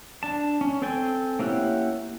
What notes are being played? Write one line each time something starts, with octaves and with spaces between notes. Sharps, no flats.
D4 A5
C#4
C4 A4 G5 G#5
A#3 C#4 E4 G4 F#5